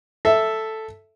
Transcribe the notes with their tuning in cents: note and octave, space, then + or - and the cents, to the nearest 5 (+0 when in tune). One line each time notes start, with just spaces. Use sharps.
A4 +0 E5 +0